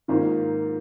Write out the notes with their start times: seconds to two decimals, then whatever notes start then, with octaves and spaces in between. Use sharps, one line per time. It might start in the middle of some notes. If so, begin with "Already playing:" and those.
0.08 G#2 D#3 A#3 F4 C5